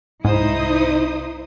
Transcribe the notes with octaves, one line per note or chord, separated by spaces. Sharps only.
C2 G#2 D#4 E4 C5 D#6